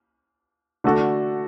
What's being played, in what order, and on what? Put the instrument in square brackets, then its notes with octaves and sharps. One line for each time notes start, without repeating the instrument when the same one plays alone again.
[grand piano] D3 A3 D4 F#4 A4